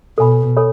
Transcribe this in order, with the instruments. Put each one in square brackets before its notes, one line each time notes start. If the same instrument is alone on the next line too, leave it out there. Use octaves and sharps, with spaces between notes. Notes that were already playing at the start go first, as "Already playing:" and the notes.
[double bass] B2 [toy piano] A4 C#5 G#5 B5
[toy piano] A4 C#5 G#5 B5